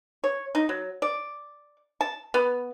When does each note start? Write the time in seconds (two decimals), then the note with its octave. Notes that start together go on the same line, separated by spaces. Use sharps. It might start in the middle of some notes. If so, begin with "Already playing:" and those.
0.24 C#5
0.55 D#4
0.69 F#3
1.02 D5
2.01 A5
2.34 B3